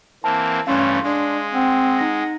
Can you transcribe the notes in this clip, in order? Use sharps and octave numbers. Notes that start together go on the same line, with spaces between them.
E3 A#3 C4 A5
G2 E3 A3 C#4 F5 C6
G#3 D4
C4 F#5
D#4 A#6